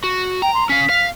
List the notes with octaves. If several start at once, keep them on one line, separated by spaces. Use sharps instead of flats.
F#4
G5 A#5
C6
C#4 F5 B6
F5